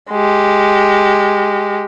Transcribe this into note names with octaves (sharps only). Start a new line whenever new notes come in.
G#3 G4